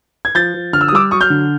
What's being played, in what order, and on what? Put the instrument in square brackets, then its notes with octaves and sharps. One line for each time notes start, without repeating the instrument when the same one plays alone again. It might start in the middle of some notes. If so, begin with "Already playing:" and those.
[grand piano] G#6
F3 G6 A6
F3
D3 F6
E6
D#6
G3 D6 E6
F#3 C#6 D#6
F6 G6
D3